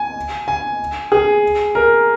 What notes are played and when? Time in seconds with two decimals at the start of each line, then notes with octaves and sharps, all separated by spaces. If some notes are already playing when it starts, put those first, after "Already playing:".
Already playing: G#5
0.48 G#5
1.12 G#4
1.75 A#4